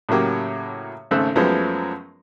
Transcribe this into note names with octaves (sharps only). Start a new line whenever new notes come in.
A2 C#3 F#3 A#3 G4
G#1 C#3 A3 C5 E6 F#6
F#2 F3 F#3 G#3 A3 B3